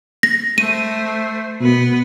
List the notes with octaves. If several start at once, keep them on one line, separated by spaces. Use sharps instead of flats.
A#6
A3 C5 D#7
B2 B3 B4